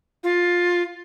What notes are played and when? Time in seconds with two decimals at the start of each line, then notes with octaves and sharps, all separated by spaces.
0.23 F4